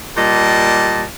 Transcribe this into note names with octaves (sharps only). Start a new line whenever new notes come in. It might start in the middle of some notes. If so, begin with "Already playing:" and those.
A#2 G3 D#5 A5